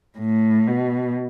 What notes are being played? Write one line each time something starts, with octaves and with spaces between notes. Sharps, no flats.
A2
B2